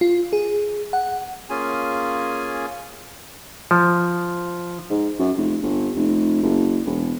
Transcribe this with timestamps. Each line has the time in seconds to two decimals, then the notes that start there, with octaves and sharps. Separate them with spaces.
0.01 F4
0.33 G#4
0.93 F#5
1.50 A#3 C#4 F4 G#4 G#5
3.71 F3
4.90 G#2
5.19 F#2
5.37 F1
5.63 G1
5.96 F1
6.43 F#1
6.86 E1